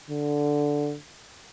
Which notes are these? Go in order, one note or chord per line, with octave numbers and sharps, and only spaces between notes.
D3